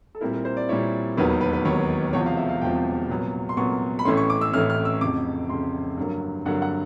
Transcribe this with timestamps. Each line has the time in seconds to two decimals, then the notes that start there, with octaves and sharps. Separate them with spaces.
0.15 A4
0.21 A#2 G3 C4 E4 A#4
0.33 A#4
0.45 C5
0.57 D5
0.69 A#2 G3 C4 E4 C#5
1.17 E1 D#2 D#3 F#3 B3 B4
1.29 B4
1.41 B4
1.53 B4
1.65 E1 D#2 D#3 F#3 B3 C#5
2.13 E1 E2 C3 F3 C#5
2.26 F5
2.37 E5
2.49 F5
2.62 E1 E2 C3 F3 G5
3.09 C2 A#2 F#3 B3
3.49 C6
3.57 C2 A#2 F#3 B3 C#6
3.99 B5
4.05 A1 A2 E3 A3 C#4 C6
4.17 C#6
4.30 D6
4.41 E6
4.53 A1 A2 E3 A3 C#4 F6
4.70 F6
4.85 E6
5.01 F1 F2 C#3 D6
5.49 F1 F2 C#3 C6
5.97 G2 D3 F#3 A#3
6.46 G2 D3 F#3 A#3 F#5
6.62 F#5